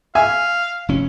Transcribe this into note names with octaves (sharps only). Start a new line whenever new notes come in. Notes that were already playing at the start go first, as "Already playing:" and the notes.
E5 F5 G#5
F1 C#4